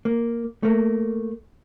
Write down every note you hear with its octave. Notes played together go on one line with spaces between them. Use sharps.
A#3
A3 A#3